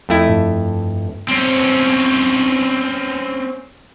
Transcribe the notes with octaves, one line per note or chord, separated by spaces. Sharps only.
F2 A3 E4
G2
C4 C#4